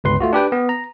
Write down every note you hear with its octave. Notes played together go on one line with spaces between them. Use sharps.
G1 C#2 B4 C6
A3 F4 F#4
D4 G4 B4 G5
B3
A#5